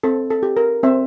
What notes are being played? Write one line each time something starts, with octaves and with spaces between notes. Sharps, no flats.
C4 A4
A4
G4
A#4
C4 E5